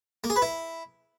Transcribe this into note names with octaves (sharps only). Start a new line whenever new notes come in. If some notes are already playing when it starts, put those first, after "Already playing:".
A#3
G#4
B4
E4